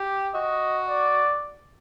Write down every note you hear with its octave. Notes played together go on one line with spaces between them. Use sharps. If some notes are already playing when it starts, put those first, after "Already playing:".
Already playing: G4
F#4 D#5
D5